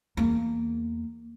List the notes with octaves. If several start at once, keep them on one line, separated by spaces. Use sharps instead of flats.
E2 A#3